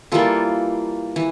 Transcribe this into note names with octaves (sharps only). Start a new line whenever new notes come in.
E3 G3 A#3 F4 A4
E3